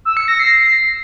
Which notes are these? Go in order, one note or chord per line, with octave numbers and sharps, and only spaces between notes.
E6
C#7
A#6
C7
C7